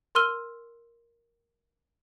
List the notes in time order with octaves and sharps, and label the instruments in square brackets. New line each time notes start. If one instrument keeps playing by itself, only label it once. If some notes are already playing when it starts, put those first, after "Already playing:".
[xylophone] A#4 C6 E6 F6 D#7 G7